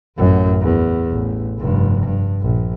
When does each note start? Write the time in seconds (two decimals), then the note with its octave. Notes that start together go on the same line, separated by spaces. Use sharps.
0.18 A1 F#2
0.61 E2
1.11 A1
1.59 F1 G2
2.04 G2
2.42 A#1